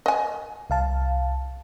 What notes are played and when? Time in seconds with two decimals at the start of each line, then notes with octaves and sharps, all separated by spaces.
0.06 D#5 G#5
0.70 C2 F5 A5